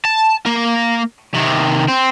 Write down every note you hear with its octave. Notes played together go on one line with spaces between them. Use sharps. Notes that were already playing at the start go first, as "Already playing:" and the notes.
A5
A#3 A#4
C3 D#3
C4